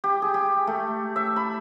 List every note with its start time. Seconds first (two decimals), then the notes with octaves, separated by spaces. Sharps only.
0.04 G4
0.22 G#4
0.34 G4
0.67 A3
1.16 E5
1.36 B5